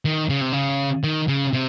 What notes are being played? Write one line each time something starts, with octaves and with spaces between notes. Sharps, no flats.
D#3
C#3
C3
C#3
D#3
C#3
C3